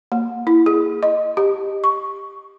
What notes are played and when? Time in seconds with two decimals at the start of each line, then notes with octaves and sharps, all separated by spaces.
0.12 A#3
0.47 E4
0.66 G#4
1.03 D#5
1.37 G4
1.84 C#6